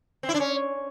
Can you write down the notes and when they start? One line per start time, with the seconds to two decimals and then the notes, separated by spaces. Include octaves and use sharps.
0.23 C4
0.29 E4
0.34 D4
0.40 C#4